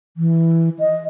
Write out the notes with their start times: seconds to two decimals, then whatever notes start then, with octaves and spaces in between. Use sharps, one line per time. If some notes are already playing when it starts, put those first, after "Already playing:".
0.17 E3
0.79 D#5